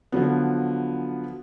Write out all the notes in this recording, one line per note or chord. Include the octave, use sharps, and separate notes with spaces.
D3 F3 F#3 B3